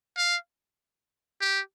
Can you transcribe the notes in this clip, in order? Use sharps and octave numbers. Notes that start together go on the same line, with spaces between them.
F5
G4